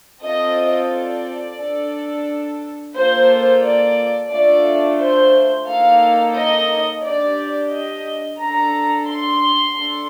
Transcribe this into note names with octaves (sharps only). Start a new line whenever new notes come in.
C4 F4 A4 D#5
D5
D4 A4
A#3 F4 A4 C5
D5
A3 D4 F4 A4 D5
C5
A#3 D#4 A4 F5
D#5
D4 G4 D5
D#5
D4 A4 A#5
C6
D4 A4